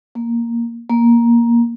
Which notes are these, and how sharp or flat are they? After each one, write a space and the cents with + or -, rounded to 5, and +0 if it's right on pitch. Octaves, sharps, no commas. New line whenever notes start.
A#3 +0
A#3 +10